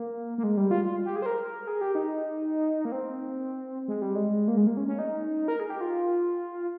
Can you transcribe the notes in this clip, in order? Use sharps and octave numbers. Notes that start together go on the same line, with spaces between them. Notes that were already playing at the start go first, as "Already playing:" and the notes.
Already playing: A#3
A#3
G#3
G3
F4
F4
G4
G#4
C5
A#4
G#4
G4
D#4
A#3
C4
G#3
G3
G#3
A#3
G#3
A#3
C#4
C#4
D#4
A#4
G#4
G4
F4